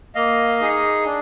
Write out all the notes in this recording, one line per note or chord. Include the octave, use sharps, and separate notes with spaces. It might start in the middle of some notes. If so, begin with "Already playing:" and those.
A#3 D#5 F5
D#4 G#4
D4